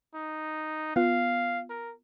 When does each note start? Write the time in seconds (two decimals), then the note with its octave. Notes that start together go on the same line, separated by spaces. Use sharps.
0.15 D#4
0.96 B3 F4 F5
1.70 A#4